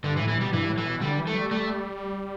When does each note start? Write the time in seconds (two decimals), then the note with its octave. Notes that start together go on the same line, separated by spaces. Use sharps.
0.04 G2 D3
0.17 E3
0.21 A2
0.28 E3
0.38 B2 G3
0.53 G2 E3
0.69 A2
0.78 E3
0.86 B2
1.02 D3 G3
1.19 E3
1.27 A3
1.35 G3
1.51 G3 A3